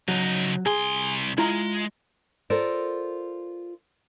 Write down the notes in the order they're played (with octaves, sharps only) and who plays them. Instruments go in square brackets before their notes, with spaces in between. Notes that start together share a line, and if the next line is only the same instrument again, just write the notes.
[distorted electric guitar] C#3 D#4 [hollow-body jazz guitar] F#3
[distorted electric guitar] C2 C6 [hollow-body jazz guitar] G#4
[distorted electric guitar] G#3 [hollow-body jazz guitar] E4 F4 A#5
[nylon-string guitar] F4 A4 A#4 C5 D5